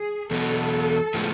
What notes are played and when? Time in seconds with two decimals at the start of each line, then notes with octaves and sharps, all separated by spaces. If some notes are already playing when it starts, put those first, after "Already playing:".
Already playing: G#4
0.31 E2 B2 F#3 B3 A4
1.14 A2 F3 G#3 B3